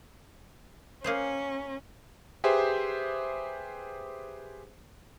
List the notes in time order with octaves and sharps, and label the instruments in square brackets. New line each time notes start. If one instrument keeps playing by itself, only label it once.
[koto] A#3 G#4 C5 [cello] C#4
[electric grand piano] G4 G#4 B4 C5 E5